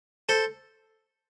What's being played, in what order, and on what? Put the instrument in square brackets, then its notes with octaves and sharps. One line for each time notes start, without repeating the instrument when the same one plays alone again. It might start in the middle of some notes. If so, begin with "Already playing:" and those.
[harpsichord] A4 C5